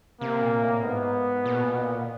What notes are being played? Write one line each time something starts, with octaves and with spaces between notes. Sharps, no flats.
C3 A#3
A#2
A2
G#2 B3
A#2
B2
A#2
B2
A#2